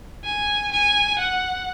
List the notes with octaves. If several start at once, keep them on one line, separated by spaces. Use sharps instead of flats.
G#5
G#5
F#5